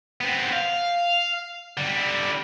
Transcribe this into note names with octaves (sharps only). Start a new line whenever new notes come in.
B3 C4
F5
D3 G3